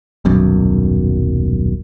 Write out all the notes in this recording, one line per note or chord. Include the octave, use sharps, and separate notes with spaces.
D#1 B1 F#2